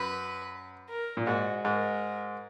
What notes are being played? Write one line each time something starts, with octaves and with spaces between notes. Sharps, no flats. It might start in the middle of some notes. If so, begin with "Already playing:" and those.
Already playing: F#2 B4
A#4
A#2
G#2 F#4
G#2 A#4